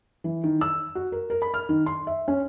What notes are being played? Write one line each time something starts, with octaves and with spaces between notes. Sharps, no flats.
E3
D#3
E6
F#4
A#4
A#4
B5
F6
D#3
C6
E5
C#4